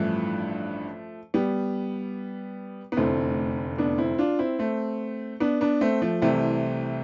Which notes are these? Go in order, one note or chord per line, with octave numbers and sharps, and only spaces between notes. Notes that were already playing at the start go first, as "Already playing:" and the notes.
Already playing: A1 G2 E3 F3 A3
G3 B3
B3
F1 E2 D3 A3 C4
B3 D4
C4 E4
D4 F4
C4 E4
A3 C4
B3 D4
B3 D4
A3 C4
F3 A3
C2 C3 E3 A3 C4